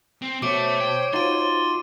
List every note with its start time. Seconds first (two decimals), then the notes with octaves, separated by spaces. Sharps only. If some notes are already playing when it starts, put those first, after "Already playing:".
0.22 C4
0.42 B2 A3 C5 C#5 D6 D7 G7
0.81 G5
1.13 D#4 F4 F#4 C6 A6 D#7